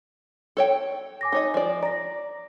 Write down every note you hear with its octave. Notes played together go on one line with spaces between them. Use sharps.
A4 C#5 G5
G#5 D6 A#6
D#4 C#5 D#5
F3 D5
D5 A#5 A#6